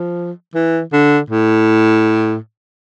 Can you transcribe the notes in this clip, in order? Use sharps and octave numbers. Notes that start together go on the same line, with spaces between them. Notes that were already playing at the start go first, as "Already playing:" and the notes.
Already playing: F3
E3
D3
A2